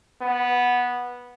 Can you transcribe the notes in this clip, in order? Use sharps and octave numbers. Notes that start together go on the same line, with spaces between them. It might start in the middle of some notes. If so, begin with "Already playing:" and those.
B3